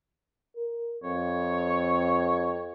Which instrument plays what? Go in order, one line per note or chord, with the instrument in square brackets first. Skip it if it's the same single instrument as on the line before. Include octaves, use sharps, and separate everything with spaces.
[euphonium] A#4
[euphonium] F2 [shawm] C#5